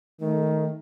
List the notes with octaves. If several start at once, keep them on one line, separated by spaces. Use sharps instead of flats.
D#3 A3